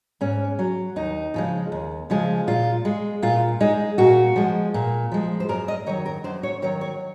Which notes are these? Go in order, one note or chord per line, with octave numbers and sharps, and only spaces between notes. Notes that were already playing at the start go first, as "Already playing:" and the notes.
G#2 C#4
F#3
D#2 D#4
C#3 F3 G#3
D#2
C#3 F3 G#3
A#2 F4
G#3
A#2 F4
G#3 D#4
A#2 F#4
F3 G#3
A#2
F3 G#3
C5
F#2 A#4
D#5
D#3 F#3 C#5
A#4
F#2 C5
C#5
D#3 F#3 C#5
C#5